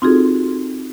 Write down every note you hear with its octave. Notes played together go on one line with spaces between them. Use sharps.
C4 D#4 F4 F#4 G#4 A4